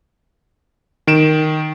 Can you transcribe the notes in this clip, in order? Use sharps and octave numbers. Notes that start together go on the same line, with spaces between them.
D#3 D7 E7